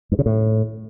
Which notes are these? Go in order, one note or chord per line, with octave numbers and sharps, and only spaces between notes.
G2
C#3
A2